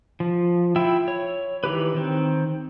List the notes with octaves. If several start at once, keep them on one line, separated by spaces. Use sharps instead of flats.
F3
E4 F4 E5 G5 E6
C#5
D#3 E3 G4 B4
D#3 C4